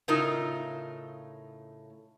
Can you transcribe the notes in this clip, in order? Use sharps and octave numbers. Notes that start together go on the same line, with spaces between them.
A2 C#3 D#4 F4 A#4 E5